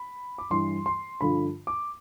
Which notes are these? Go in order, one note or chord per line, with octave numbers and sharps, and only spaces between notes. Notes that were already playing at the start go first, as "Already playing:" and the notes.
Already playing: B5
D6
G2 E3 G3 C6
C6
G2 D3 F3 B5
D6